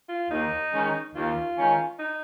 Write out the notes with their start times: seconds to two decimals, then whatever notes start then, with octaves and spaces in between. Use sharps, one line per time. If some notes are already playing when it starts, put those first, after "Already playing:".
0.09 F4
0.30 D#2 D#4
0.72 D#3 G#3 C#4
1.15 D#2 F4
1.57 D#3 G#3 C#4
1.99 D#4